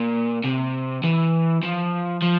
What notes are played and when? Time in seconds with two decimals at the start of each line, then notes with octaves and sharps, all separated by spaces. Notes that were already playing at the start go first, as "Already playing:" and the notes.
Already playing: A#2
0.44 C3
1.04 E3
1.63 F3
2.22 F3